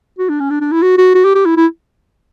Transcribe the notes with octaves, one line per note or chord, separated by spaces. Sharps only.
F#4
D4
C#4
D4
D4
E4
F#4
F#4
F#4
G4
G4
E4
E4